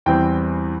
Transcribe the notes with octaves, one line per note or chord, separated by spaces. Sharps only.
E2 E3 G3 C4 G5